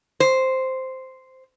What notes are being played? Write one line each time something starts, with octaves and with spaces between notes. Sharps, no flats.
C5